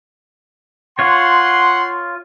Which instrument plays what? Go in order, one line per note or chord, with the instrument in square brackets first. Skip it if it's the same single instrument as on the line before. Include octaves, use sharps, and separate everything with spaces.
[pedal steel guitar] F4 C#5 [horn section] F#5 C6